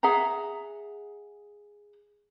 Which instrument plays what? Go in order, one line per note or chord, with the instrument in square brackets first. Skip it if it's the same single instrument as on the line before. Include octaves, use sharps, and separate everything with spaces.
[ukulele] G#4 E5 F#5 A#5